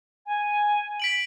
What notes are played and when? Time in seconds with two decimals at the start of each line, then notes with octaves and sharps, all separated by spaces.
0.26 G#5
1.00 B6 D7 F#7